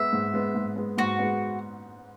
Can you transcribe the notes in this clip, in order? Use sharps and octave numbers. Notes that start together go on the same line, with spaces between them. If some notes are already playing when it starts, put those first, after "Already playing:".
Already playing: G#3 B3 E5
G#2
G#3 B3
G#2
G#3 B3
G#2 F#4
G#3 B3